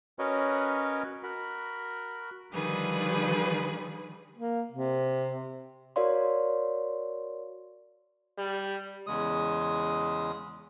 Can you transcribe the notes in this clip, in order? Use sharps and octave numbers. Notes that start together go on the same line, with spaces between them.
C#4 F#4 A#4 B4 C#5 D#5
F#4 A#4 B5
D3 D#3 F3 G3 G#4 B4
A#3
C3
F#4 A#4 C#5 D5 F5 C6
G3
E2 C#3 G#3 D#6